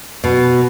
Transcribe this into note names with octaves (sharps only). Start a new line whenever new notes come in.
B2